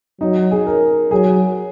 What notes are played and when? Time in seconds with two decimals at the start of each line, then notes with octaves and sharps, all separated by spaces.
0.21 F#3 D#4
0.51 G#4
0.67 A#4
1.11 F#3 G#4